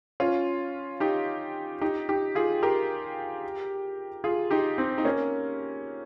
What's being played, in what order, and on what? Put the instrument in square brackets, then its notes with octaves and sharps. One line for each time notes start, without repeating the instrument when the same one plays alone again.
[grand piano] C#4 F4
D#4 G4
D#4 G4
D#4 G4
F4 G#4
G4 A#4
F4 G#4
D#4 G4
C4 D#4
D#4
A#3 C#4